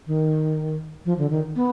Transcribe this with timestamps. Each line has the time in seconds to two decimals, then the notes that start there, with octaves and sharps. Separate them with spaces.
0.07 D#3
1.05 F3
1.18 D3
1.30 D#3
1.55 B3